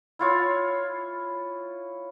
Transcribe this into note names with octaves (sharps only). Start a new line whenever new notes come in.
E4 F4 C#5